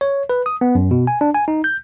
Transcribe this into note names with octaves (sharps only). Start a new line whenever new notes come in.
C#5
B4
D#6
B3
F#2
B2
G#5
D4
G#5
D#4
G6